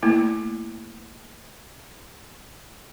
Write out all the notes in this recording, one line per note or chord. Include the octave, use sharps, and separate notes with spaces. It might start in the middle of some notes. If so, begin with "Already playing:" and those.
A3 A#3 E4